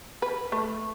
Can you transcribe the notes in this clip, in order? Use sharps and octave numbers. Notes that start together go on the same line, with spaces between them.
B4
A3